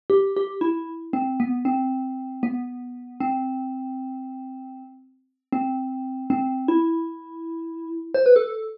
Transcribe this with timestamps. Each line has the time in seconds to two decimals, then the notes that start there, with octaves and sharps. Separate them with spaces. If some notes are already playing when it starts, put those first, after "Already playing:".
0.10 G4
0.37 G4
0.61 E4
1.13 C4
1.40 B3
1.65 C4
2.43 B3
3.20 C4
5.53 C4
6.30 C4
6.68 E4
8.14 C5
8.26 B4
8.36 A4